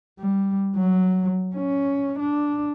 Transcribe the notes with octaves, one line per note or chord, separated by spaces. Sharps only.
G3
F#3
C#4
D4